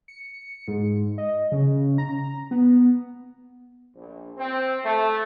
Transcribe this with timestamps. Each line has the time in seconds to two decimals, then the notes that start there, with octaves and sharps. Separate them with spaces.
0.08 C#7
0.68 G#2
1.18 D#5
1.52 C#3
1.98 A#5
2.51 B3
3.95 A#1
4.37 C4
4.83 A3